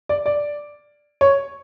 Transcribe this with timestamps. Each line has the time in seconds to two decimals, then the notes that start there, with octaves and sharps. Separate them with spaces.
0.09 D5
0.26 D5
1.21 C#5